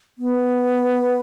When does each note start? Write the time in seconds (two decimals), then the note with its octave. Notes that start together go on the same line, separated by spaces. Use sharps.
0.18 B3